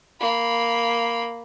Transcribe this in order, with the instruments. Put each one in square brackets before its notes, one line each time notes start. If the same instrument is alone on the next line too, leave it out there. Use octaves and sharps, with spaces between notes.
[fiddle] A#3 B5